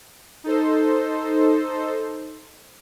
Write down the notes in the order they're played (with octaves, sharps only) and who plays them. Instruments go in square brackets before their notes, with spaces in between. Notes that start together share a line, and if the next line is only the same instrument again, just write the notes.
[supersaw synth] D#4 A4 C5